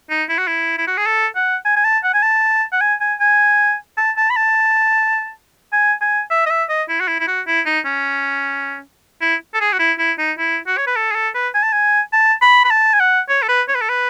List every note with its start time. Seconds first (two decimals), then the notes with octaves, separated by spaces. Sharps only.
0.10 D#4
0.29 E4
0.38 F#4
0.47 E4
0.78 E4
0.87 F#4
0.97 G#4
1.06 A4
1.36 F#5
1.65 G#5
1.76 G#5
1.85 A5
2.04 F#5
2.13 G#5
2.23 A5
2.72 F#5
2.81 G#5
3.01 G#5
3.20 G#5
3.97 A5
4.17 A5
4.30 B5
4.36 A5
5.72 G#5
6.01 G#5
6.30 E5
6.46 D#5
6.50 E5
6.69 D#5
6.89 E4
7.00 F#4
7.07 E4
7.20 E4
7.27 F#4
7.47 E4
7.66 D#4
7.85 C#4
9.21 E4
9.54 A4
9.61 G#4
9.72 F#4
9.79 E4
9.99 E4
10.18 D#4
10.38 E4
10.67 F#4
10.77 C#5
10.87 B4
10.96 A4
11.11 G#4
11.15 A4
11.34 B4
11.54 G#5
11.63 A5
11.72 G#5
12.13 A5
12.42 B5
12.64 B5
12.70 A5
12.93 G#5
13.00 F#5
13.29 C#5
13.43 A4
13.48 B4
13.68 C#5
13.75 B4
13.81 A4
13.89 B4